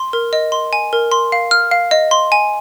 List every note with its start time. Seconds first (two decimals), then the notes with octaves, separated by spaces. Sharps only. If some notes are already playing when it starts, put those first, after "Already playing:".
Already playing: C6
0.13 A#4
0.33 D#5
0.52 C6
0.73 G#5
0.93 A#4
1.12 C6
1.32 F5
1.51 F6
1.71 F5
1.91 D#5
2.11 C6
2.32 G#5